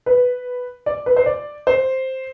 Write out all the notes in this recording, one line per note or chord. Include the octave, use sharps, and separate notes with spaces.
B4
D5
B4
C5
D5
C5